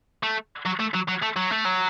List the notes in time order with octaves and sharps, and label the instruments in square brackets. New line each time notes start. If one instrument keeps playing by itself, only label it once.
[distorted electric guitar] A3
F#3
A3
F#3
F#3
A3
F#3
A3
F#3